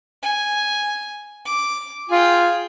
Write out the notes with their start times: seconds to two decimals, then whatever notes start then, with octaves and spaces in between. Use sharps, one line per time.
0.23 G#5
1.45 D6
2.09 F4 G#4 G5